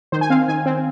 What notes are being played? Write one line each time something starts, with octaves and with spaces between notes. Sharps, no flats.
D#3 C5
G#5
C4 F5
D#3 G#5
C4